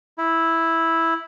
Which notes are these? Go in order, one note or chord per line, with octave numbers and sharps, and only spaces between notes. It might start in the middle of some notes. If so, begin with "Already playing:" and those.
E4